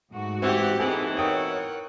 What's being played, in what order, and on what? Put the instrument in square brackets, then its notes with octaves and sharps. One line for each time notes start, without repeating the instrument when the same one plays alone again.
[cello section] G#2 A3 F#4
[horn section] E3 [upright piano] C4 [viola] G4 F#5
[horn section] B2 E3 [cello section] C4 D#4 A4 [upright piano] G#4
[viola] A#4 F#5 [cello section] C#5 [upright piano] G5 D#6